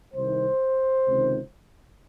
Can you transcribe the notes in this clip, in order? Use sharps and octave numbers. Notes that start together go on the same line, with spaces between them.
C2 C3 D#3 C5
C#2 C3 D#3